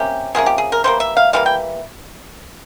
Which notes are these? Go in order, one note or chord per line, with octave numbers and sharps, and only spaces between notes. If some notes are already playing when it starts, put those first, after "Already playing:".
Already playing: C3 A#3 C#4 G4
C3 F3 A#3 C#4 G#4
G4
G#4
A#4
E3 G3 A#3 C5
E5
F5
E3 G3 A#3 F5
G5